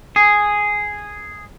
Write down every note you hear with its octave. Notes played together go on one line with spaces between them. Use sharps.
G#4